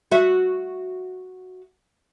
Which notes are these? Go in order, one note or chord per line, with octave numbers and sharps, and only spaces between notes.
F#4 E5